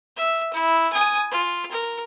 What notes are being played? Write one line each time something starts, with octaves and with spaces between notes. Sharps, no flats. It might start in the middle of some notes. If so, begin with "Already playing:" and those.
E5
E4
G#5 D#6
F4
A#4